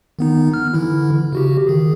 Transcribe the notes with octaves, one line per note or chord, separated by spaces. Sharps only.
D#3 B3 D#4
F6
D3 E3 E4
C#3 F#4 G4
D#3 G#4